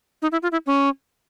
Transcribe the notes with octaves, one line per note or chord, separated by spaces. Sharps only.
D#4
E4
F4
E4
C#4